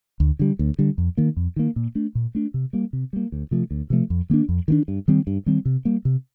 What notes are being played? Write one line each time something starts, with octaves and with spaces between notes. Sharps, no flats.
D2
D3 G3
D2
D3 G3
F2
D#3 A#3
F2
D#3 A#3
A#2
A3 D4
A#2
A3 D4
C3
G3 A#3
C3
G3 A#3
D2
C3 F3 A3
D2
C3 F3 A3
F2
D#3 A#3 D4
F2
D#3 A#3 D4
G2
D#3 G3 C4
G2
D#3 G3 C4
C3
G3 A#3
C3